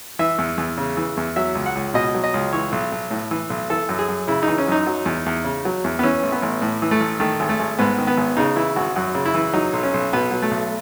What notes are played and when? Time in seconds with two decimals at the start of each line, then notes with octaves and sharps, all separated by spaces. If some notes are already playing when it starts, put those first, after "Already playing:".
0.19 E3 E5
0.38 E2
0.58 E2
0.78 C#3
0.97 E3
1.17 E2
1.36 F#3 E5
1.55 C#2
1.66 F#5
1.75 C#2
1.94 B2 D#5
2.15 F#3
2.24 D#5
2.34 C#2
2.53 E3 C#5
2.72 B1
2.92 B1
3.11 A2
3.31 E3
3.50 B1
3.70 E3 A4
3.89 F#2
3.99 G#4
4.09 F#2
4.28 C#3 E4
4.43 D#4
4.48 E3
4.58 C#4
4.68 F#2 D#4
4.87 F#3
5.06 E2
5.26 E2
5.45 C#3
5.65 F#3
5.84 E2
5.99 B3
6.03 E3 C#4
6.23 A1
6.32 B3
6.42 A1
6.62 A2
6.82 E3
6.91 A3
7.00 A1
7.20 D#3 A3
7.40 G#1
7.49 A3
7.60 G#1
7.79 G#2 B3
7.98 D#3
8.07 B3
8.17 G#1
8.37 C#3 D#4
8.56 E3 E4
8.76 G#1 F#4
8.96 F#2 F#4
9.15 C#3
9.26 E4
9.34 E3
9.54 F#3 D#4
9.73 B1
9.83 C#4
9.94 B1
10.13 B2 B3
10.31 F#3
10.42 A3
10.51 B1